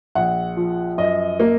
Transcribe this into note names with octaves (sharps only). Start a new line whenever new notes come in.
A#1 F#5
F3
F#2 D#5
A#3